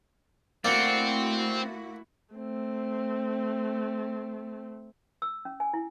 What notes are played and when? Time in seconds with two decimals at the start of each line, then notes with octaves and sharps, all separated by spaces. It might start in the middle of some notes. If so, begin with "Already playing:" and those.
0.65 A3 A#3 C4 E4 F#4 D5 F#5
2.34 A3 C4
5.22 E6
5.45 C#4
5.60 G#5
5.73 E4